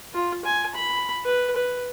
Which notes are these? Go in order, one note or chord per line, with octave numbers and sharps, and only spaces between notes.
F4
G#5
B5
B4
B4